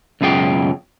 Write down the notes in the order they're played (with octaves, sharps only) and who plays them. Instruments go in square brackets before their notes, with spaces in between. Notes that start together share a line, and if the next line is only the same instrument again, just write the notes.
[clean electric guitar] C#2 F#2 B2 F4 G#4 G5